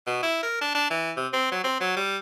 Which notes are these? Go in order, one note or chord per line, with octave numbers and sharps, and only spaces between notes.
B2
E4
A#4
D4
D4
E3
C3
C4
F#3
C4
F#3
G3